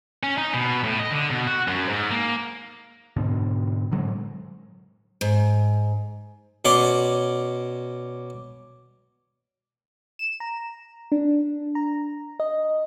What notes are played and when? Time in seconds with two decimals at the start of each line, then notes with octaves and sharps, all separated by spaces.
0.23 C#4
0.38 D#4
0.54 B2
0.84 A2
0.99 D#5
1.11 D3
1.30 B2
1.47 F#4
1.68 F#2
1.89 G#2
2.11 A#3
3.16 G#2 B2 D3
3.91 A2 D3 F#3 G#3
5.21 G#2
6.65 B2 C#4 D5 C6 D6
10.19 E7
10.40 A#5
11.12 D4
11.75 A#5
12.40 D#5